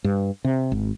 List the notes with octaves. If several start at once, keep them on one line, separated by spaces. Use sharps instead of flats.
G2
C3
G#1